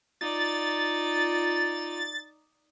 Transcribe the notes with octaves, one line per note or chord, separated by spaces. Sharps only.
D#4 F4 D5 A6